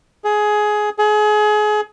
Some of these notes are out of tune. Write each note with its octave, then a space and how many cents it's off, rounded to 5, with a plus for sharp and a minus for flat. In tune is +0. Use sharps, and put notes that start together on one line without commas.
G#4 +15
G#4 +30